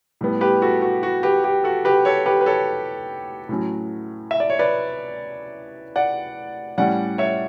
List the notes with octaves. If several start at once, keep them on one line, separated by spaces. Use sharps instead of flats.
A2 G3 B3
G4 B4
F#4 A4
F#4
F#4
G4 B4
G4
F#4 A4
G4 B4
A4 C#5
G4 B4
B4
A4 C#5
A2 F#3 C#4
E5
D5
C#5
B4 D5
D5 F#5
A2 G3 C#4 D5 F#5
C#5 E5